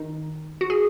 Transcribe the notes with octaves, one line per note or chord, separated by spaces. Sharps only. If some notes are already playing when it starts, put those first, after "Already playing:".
Already playing: D#3 D#4
F#4
G#4